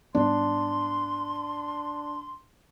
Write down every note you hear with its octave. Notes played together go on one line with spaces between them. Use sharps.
G#2 G3 B3 D4 C6